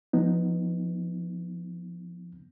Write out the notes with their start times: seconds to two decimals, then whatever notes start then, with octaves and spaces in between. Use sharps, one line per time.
0.13 F3 B3 D#4